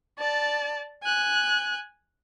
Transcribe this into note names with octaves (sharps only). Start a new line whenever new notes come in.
D5 A5
G#5 F#6